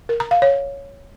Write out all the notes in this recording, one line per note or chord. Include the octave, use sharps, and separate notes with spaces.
A#4
A#5
F5
C#5